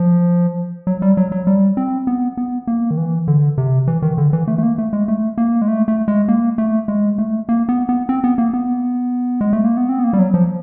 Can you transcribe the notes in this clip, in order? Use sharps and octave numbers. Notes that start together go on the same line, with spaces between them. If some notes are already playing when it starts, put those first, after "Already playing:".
Already playing: F3
F#3
G3
F#3
F#3
G3
C4
B3
B3
A#3
D#3
E3
D3
C3
E3
D#3
D3
E3
A3
A3
A#3
A3
G#3
A3
A#3
G#3
A3
A3
G#3
A#3
A3
G#3
A3
A#3
B3
B3
C4
B3
A#3
B3
G#3
A3
A#3
B3
C4
B3
A#3
G3
F#3
F3